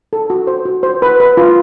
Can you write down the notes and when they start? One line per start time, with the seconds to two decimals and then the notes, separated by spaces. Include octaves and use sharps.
0.13 A4
0.30 F#4
0.47 C5
0.65 F#4
0.83 C5
1.02 B4
1.20 B4
1.37 F4